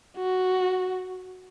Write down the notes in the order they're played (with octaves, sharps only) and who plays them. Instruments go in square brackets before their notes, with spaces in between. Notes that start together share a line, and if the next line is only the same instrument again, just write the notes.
[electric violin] F#4